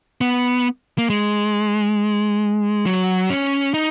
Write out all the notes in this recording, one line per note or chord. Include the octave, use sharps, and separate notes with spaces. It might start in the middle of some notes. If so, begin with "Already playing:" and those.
B3
A#3
G#3
F#3
C#4
D#4